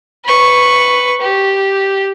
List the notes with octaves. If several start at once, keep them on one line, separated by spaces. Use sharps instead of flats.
B4 C#6
G4